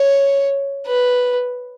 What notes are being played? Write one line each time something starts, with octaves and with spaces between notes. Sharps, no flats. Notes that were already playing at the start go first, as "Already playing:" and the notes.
Already playing: C#5
B4